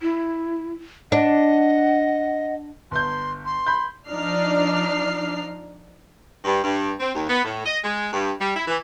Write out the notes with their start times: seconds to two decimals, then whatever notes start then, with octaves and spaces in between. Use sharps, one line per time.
0.02 E4
1.12 D4 D#5 F#5
2.91 G1 C6 G6
3.45 C6
3.66 B5 G6
4.09 F3 D4 D#4 D5 F6 C7
6.45 G2
6.63 G2
6.99 C4
7.14 D#2
7.28 B3
7.44 A2
7.65 D#5
7.83 G#3
8.12 G2
8.39 G3
8.56 E4
8.68 E3